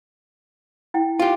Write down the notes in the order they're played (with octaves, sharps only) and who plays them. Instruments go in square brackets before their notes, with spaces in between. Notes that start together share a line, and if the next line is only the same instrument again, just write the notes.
[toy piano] E4 G5
[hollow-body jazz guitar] F4 G4